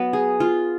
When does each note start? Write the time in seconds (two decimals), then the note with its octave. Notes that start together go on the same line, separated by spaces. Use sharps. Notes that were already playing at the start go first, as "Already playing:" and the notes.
Already playing: F#3 B3
0.13 G#4
0.40 F4